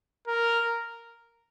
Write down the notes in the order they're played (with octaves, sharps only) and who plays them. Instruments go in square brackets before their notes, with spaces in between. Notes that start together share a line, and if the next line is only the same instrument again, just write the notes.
[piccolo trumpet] A#4